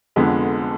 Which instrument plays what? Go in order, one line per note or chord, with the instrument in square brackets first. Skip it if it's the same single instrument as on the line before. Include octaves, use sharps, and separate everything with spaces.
[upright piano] F1 F2 D3 G#3 B3